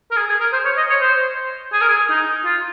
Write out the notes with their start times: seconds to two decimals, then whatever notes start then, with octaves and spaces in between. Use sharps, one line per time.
0.11 A#4
0.16 G#4
0.29 G#4
0.40 A#4
0.53 C5
0.65 C#5
0.77 D#5
0.90 C#5
1.01 C5
1.73 G#4
1.81 A#4
1.89 G#4
2.10 D#4
2.45 F4